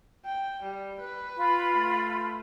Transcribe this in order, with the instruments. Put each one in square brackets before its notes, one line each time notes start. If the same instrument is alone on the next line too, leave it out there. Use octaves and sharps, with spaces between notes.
[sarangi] G5
G3
B4
[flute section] F4 B5
[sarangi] A3